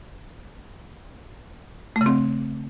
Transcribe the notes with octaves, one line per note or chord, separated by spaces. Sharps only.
A3
C#3
C4